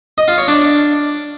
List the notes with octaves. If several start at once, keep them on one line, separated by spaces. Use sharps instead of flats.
D#5
F4
C#5
D4